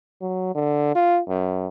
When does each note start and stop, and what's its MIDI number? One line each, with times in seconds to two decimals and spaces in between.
0.22 0.52 54
0.55 0.95 50
0.96 1.20 65
1.29 1.67 42